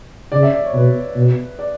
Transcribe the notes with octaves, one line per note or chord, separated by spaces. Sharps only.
C#3 D5
E5
D5
C#5
B2 B4
B2
D5